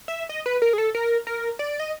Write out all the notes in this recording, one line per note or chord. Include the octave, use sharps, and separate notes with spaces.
E5
D#5
B4
A#4
G#4
A4
A#4
A#4
D5
D#5